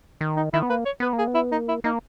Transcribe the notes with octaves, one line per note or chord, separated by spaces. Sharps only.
D#3
D#4
D#3 E4
B3
A#3 B4
C#5
B3 B4
A#3
G#4
B3
E4
A#3 D#4
E4
A#3 D#4